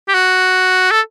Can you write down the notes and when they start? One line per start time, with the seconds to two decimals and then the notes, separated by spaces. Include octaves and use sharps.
0.09 G4
0.14 F#4
0.91 A4